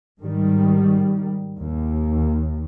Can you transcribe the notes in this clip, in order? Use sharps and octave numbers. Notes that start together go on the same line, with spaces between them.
G#2 D#3 G3
D#2